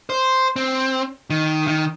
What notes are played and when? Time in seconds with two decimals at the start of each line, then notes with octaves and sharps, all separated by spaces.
0.10 C5
0.56 C4
1.30 D#3
1.68 D#3